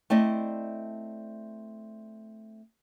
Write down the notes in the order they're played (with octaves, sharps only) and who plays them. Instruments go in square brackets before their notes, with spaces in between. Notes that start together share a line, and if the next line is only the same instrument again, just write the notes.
[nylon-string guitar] A3 C4 E4 D5 D#5